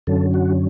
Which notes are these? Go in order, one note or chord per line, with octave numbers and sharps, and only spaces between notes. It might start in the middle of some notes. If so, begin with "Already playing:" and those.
F#2 D3 F#3 C#4 A4
F#4